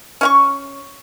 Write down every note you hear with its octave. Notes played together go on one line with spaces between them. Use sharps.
C#4 F5 C#6